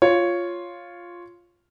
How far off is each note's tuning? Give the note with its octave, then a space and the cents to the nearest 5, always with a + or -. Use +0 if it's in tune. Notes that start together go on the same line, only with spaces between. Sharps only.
F4 +0 C#5 +0